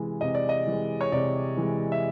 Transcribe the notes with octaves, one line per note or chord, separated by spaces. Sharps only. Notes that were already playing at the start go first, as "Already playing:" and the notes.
Already playing: C3 E3 G#3
C3 D#5
D5
D#5
E3 G#3
C#5
C3 D5
E3 G#3
E5